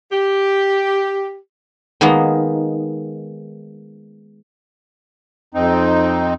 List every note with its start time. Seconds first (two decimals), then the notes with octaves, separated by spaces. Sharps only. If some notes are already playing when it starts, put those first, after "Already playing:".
0.12 G4
2.01 D#3 G#3 A#3 B3 D#4
5.54 F2 C4 D#4